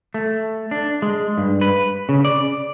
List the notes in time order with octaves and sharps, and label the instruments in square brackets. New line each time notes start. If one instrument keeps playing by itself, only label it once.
[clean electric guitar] A3
D4
G#3
G2
B4
C#3
D5